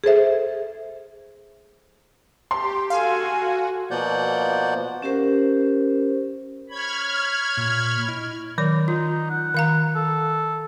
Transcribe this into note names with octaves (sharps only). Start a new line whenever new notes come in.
G#4 A4 C5 E5
G4 A5 C6
F#4 A4 F5 G#5
B2 F3 A#3 D5 F#5 G6
C#4 G4 A#4 C5
C#5 B5 F6 G#6
A#2
E4 D#5
D#3 F#3 D5
D#4 F4
F#5
D#3 F5 A#5
A4